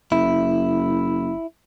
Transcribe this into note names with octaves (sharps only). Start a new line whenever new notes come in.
F#1 E4